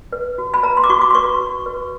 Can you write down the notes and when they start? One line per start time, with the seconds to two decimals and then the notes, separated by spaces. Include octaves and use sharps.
0.12 B4
0.38 F#4
0.54 B5
0.63 B4 A#5
0.77 C6
0.84 D6
0.90 F#4 C#6
1.01 D6
1.10 C6
1.15 B4 C#6
1.40 F#4
1.66 B4